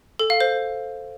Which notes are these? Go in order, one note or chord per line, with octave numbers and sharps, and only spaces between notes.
A4
F5
C5